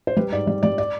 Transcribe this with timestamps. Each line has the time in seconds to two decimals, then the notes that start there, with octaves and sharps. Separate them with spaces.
0.07 C5
0.16 G3 B4
0.32 G#2 D5
0.47 G3 D5
0.63 G3 D5
0.78 D5